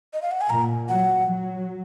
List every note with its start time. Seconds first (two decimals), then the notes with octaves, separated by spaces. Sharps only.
0.13 D#5
0.22 F5
0.31 F#5
0.41 G#5
0.50 A#2 A#5
0.89 F#3 F#5
1.27 F#3